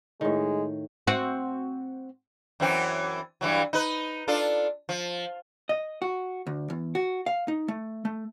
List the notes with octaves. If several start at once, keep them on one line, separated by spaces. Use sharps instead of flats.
A2 D#3 G#3
C4 F#4
F#2 E3 C4
G2 E3 F#3
D#4 B4
D4 F4 A4
F3
D#5
F#4
D2
E2
F#4
F5
D#4
A3
A3